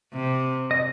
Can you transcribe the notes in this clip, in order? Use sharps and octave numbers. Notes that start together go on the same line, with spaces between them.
C3
D#5